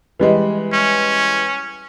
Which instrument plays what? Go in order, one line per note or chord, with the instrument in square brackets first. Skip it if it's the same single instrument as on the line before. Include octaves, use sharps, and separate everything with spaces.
[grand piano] E3 G3 G#3
[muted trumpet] C#4